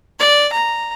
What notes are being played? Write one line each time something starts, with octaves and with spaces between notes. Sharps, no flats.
D5
A#5